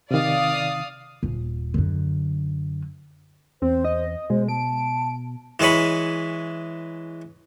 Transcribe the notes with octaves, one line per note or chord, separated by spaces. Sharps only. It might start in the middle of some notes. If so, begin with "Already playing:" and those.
C3 D#3 D5 F5 D#6
D#1
F#2 D3
E2 C4 C5
D#5
B2 G#3 C5
A5 D7
E3 G#3 G#4 C#5 B5